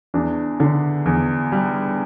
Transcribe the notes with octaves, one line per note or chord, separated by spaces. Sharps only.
E2 D4
D3
E2
G3